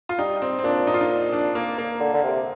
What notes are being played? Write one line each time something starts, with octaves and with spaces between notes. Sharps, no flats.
F4
G3 D#4
C4
C4
A#2 D4
D#4
F4
D#4
D4
A#3
A#3
D3
D3
C3